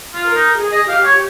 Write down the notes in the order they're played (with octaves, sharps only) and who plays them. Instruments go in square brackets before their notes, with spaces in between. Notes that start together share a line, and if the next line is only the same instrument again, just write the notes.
[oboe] F4
[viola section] A#4
[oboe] D#4
[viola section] G#4
[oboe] D#5
[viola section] G4 [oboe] F5
[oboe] C#5